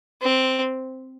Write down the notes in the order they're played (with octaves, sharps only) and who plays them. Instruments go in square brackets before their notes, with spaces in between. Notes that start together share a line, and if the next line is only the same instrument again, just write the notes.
[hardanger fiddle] C4